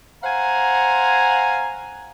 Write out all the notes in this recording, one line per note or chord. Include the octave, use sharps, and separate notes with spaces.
C5 F5 F#5 G#5 A#5